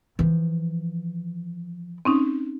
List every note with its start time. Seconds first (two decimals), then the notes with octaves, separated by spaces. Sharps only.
0.19 E3 F3
2.05 C4 C#4 D#4